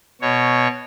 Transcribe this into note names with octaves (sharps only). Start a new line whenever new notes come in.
B2 C#5